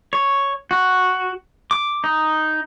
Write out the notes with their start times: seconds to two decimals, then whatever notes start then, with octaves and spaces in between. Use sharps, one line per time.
0.13 C#5
0.71 F#4
1.71 D6
2.04 D#4